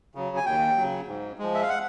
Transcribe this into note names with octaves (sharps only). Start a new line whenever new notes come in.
C#3 F#3
G#5
D#2 G5
C#3 F#3
G#2
F3 G#3
E5
F5
F#5